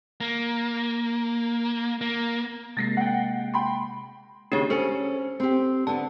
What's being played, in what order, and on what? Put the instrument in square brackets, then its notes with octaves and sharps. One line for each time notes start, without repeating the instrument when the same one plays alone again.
[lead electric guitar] A#3
A#3
[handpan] C3 G#3 A#3 [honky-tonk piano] A6 A#6 C7
[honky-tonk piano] F#5 G5
G5 B5 C6
[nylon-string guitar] D#2 C#3 [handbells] D4 G4 C#5
[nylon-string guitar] C#4 A4 G#5 [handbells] C5 C#7
[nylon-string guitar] C4 G4
[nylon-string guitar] D3 B3 [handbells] A5